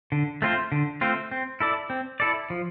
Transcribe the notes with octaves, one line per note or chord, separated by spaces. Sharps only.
D3
A3 C4 F4 C5
D3
A3 C4 F4 C5
C4
E4 A4 D5
C4
E4 A4 D5
F3